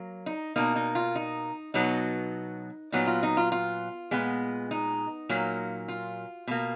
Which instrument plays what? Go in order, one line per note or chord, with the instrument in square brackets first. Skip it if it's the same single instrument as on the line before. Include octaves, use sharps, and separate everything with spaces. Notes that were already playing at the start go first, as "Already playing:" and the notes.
Already playing: [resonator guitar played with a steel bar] F#3 A#3
D#4
B2 A#3 D#4
D#4
F4
D#4
B2 F#3 B3 D#4
A#2 F#3 B3 D#4
F4
D#4
F4
F4
A#2 G#3 B3
D#4
A#2 F#3 A#3
F4
B2 A#3